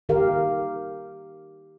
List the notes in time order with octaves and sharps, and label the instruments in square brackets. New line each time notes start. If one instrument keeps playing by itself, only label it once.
[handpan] D#3 G4 A#4 F5